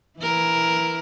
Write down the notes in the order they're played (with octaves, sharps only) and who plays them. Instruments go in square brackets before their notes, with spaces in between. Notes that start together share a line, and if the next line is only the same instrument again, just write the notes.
[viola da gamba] E3 E4 A#4